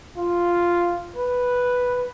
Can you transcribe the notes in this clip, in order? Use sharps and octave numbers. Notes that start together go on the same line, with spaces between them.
F4
B4